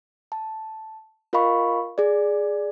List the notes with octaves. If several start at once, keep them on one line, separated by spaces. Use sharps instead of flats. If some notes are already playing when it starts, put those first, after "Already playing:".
A5
F4 A#4 D#5 F5 B5 C#6
G#4 D5